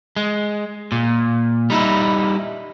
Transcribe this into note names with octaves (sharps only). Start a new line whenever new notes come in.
G#3
A#2
G3 D#4 E4